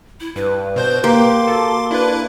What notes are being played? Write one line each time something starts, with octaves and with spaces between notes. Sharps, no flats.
E4
G2 B4
B2 C5 G6
A#3 G4 C6 D6
F#4 A4
D4 E4 B4